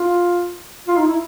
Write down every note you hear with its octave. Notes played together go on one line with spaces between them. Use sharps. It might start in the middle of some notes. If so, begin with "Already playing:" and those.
Already playing: F4
F4
D#4
E4